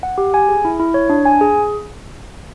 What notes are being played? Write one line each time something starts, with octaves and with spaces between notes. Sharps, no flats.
F#5
G4
G#5
G#4
E4
E4
C#5
D4
G#5
G#4